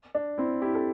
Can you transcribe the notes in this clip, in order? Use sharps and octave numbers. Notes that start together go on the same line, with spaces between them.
D4
C4 E4
E4 G4
A4